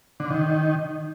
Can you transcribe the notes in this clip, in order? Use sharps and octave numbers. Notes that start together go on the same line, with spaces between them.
D3
D#3